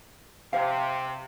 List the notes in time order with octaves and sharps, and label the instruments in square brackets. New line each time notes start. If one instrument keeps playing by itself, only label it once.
[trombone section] C3 [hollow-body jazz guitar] C5 F5